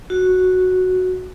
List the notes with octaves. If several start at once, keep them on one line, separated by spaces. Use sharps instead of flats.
F#4